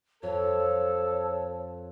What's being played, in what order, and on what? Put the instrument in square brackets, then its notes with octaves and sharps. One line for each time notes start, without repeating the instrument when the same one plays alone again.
[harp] F2 [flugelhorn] A4 [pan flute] C#5